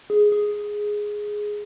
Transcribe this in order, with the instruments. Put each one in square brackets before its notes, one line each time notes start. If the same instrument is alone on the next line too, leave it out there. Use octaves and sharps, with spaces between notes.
[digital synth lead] G#4
G#4